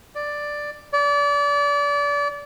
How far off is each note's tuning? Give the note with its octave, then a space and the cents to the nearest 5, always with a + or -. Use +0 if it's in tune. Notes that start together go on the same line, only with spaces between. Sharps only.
D5 +5
D5 -30